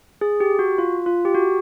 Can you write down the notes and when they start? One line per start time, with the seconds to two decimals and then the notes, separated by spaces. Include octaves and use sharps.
0.21 G#4
0.40 G4
0.59 F#4
0.78 F4
1.06 F4
1.25 G4
1.35 F#4